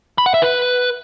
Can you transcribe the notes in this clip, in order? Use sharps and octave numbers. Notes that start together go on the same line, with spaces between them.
B5
F#5
E5
B4